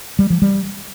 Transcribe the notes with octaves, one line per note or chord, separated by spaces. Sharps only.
G3
F3
G3